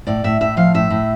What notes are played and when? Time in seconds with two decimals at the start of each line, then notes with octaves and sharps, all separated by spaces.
0.07 A2 D5
0.24 A2 E5
0.41 A2 E5
0.57 F3 F5
0.74 A2 E5
0.90 A2